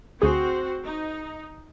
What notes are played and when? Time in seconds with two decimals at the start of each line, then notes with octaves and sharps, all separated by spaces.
0.22 D2 C4 F#4 G#4 C5
0.84 D#4